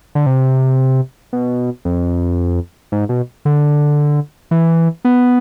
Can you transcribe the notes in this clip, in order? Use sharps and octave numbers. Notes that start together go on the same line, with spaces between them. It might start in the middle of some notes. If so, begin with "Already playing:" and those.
D3
C3
B2
F2
G#2
B2
D3
E3
B3